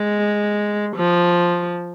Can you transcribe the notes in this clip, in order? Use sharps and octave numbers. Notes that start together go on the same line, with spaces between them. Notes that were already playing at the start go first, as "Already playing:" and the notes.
Already playing: G#3
F3